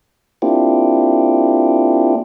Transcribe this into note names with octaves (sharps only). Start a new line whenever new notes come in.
A#3 C4 D4 E4 F4 G4